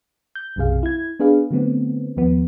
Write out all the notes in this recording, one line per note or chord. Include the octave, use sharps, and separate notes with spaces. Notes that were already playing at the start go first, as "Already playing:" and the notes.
G6
B1 F#2 C3 G#4 F5
E4 G#6
B3 D4 G#4 B4 F5
D3 F#3 A3 B3 C4
D#2 F3 B3